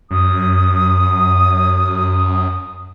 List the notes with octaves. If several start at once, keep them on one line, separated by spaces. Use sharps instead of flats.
F#2 D#6